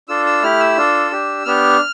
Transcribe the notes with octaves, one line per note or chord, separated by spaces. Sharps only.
D4 F4 A4 E6
E6
A3 E4 G4 F6
E6
D4 F4 A4
D4 G4
B3 D4 G4 F6